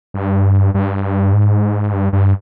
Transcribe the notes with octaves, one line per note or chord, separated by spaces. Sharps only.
G2
G2
G#2
G2
G2